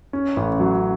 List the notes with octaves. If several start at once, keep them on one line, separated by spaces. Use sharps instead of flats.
C#4
A1
F#3